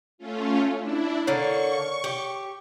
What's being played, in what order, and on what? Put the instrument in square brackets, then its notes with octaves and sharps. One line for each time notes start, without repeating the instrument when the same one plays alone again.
[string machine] A3 C#4 F4
D4 E4
[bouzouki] D3 A#3 [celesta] C#5 [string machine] C#6
[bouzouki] G4